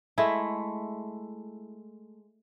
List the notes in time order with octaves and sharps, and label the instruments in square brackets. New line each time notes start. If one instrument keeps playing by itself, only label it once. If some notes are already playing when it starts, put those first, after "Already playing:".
[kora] G#3 A3 E4